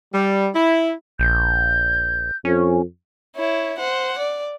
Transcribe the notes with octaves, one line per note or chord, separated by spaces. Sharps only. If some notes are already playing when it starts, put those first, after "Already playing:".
G3
E4
A#1 G6
F2 C#4
E4 C#5
C5 F#5
D5